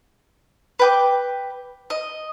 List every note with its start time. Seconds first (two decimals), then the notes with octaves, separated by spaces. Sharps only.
0.79 B4 G5 D6
1.90 D#5